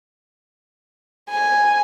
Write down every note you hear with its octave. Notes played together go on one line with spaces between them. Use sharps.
G#5